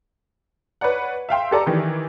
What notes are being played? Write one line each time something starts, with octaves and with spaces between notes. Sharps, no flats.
B4 C#5 D5 F#5
E5 F5 G5 C6
G4 A4 D5 A#5
D#3 E3 G4